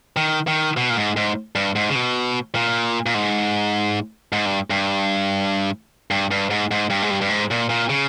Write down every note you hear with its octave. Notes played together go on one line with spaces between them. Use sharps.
D#3
D#3
B2
A#2
G#2
G#2
G2
G#2
C#3
B2
A#2
A#2
G#2
G#2
G2
G2
G2
G2
G#2
G#2
G2
G#2
G2
G2
G#2
A#2
A#2
C#3